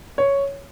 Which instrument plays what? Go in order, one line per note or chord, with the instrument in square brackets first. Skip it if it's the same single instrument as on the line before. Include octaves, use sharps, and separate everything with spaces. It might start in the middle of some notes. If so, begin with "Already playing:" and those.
[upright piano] C#5